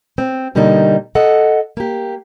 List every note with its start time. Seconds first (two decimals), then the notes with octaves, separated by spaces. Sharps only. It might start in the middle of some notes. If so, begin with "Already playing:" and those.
0.18 C4
0.55 B2 D3 G3 A#3 D#4
1.15 A4 D#5 F#5
1.77 A#3 G4